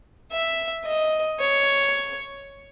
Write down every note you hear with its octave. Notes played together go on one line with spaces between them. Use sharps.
E5
D#5
C#5